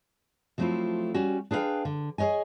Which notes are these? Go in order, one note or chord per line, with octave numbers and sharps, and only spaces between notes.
F3 F#3 A3 C4 E4 F4
G3 C#4 F#4
D4 G#4 B4 C#5 F5 G5
D3
G#4 A#4 C#5 D#5 G#5